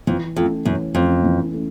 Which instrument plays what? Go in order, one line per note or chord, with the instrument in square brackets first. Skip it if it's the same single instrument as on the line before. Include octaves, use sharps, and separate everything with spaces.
[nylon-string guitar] F2 [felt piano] E3
[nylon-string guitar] F2 [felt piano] A3
[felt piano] C#4
[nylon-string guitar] F#2 [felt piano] E3
[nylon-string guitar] F2 [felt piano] A3 C#4
[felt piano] E3
A3 C#4